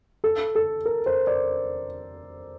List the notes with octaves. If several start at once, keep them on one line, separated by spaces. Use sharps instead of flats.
A4
A4
A#4
C5
D5